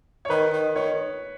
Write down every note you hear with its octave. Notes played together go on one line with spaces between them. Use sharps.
C#5
D#3 B4
D#3
D#3 C#5